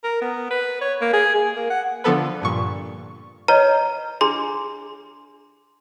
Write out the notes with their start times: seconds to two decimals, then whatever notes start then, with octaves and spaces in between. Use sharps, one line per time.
0.04 A#4
0.22 B3
0.51 B4
0.81 C#5
1.01 A#3
1.13 G#4
1.35 G#4
1.56 A#3
1.70 F#5
2.04 D3 F3 B3 A4 B4
2.42 G2 A#2 C#6
3.48 B4 C#5 D#5 A#5
4.21 D4 G#4 A#5 C6